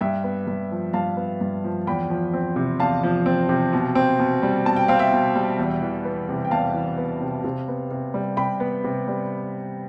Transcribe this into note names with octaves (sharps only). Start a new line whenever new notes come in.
G2 E5 G5
B3
G2
F3
G2 F5 A5
B3
G2
F3
E2 G5 B5
F3
C4
C3
E2 F5 A5
F3
C4
C3
B2
C4
B2
G3
B2 A5
G5
C4 F5
E5 G5
B2
G3
E2
E3
B3
C3
G5
E2 F5 A5
E3
B3
C3
C3
B3
C3
G3
C3 G5 B5
B3
C3
G3